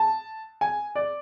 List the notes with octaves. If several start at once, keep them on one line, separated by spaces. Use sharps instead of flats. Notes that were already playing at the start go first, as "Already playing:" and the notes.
Already playing: A5
G#5
D5